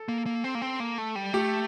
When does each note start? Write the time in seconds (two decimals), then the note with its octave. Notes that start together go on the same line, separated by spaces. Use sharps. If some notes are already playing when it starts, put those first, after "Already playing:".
Already playing: A4
0.08 A#3
0.26 A#3
0.44 C4
0.55 A#3
0.62 C4
0.80 A#3
0.98 A3
1.16 G3
1.33 A3 G4